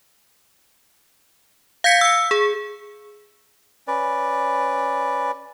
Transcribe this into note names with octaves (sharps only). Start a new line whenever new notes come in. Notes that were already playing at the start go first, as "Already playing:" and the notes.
F5 G6 G#6 B6 C#7
E6 C#7
G#4
C#4 B4 D5